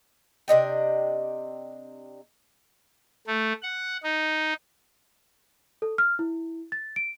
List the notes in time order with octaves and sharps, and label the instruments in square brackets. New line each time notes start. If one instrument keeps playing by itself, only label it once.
[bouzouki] C3 D4 D#5 G5
[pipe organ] A3
F#5
D#4
[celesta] A4
F6
E4
A6
D7